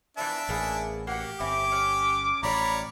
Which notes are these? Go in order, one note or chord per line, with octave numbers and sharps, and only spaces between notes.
E3 F3 B3 D4 E5 A5
A1 A#3 B3 G#4
A#3 F#4 G4 F#5
G1 C4 C#4 E4 D6
C#4 F#5
A1 F3 G3 C#5 D5 A#5 B5